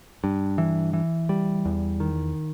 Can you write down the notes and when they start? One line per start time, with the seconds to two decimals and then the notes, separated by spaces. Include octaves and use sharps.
0.24 G2
0.58 E3
0.93 E3
1.29 G3
1.65 E2
2.00 D#3